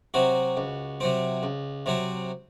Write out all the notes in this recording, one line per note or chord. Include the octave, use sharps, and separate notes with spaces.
C3 F#3 C4 F#4
C#2
C3 F#3 C4
C#2
C3 F#3 C4